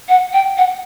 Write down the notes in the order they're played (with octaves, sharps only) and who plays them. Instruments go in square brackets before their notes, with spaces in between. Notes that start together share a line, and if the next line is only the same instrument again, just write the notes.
[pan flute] F#5
G5
F#5